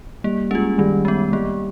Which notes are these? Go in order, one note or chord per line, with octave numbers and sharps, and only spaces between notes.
G3 A#3
G#3 C#4 F4
D#3 G3
G#3 B3
G3 A#3